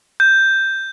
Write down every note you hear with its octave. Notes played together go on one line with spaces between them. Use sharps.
G6